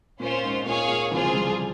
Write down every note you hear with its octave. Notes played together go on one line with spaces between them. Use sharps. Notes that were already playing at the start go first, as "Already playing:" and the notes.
A#2 C#4 F4 C5
G#2
A#2 G#4 C#5 F5
A#2
C3 E3 F4 G#4 C5
C#3 F3
E3 G3